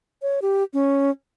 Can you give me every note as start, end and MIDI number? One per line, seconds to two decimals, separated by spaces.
0.22 0.40 73
0.42 0.63 67
0.74 1.10 61